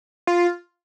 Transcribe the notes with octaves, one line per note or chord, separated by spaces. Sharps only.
F4